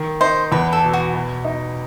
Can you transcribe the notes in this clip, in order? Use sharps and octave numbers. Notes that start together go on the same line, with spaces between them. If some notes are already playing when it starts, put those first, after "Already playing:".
Already playing: D#3
D#4 C5
E2 B4
A4
B2
F#4
B2
D#4